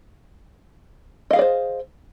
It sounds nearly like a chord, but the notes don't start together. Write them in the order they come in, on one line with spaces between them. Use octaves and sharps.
D#5 F5 G#4 D5 C5